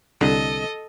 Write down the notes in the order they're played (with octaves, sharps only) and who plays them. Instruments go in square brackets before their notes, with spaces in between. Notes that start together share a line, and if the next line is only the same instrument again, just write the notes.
[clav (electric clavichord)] C2 D3 [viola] A4 D#5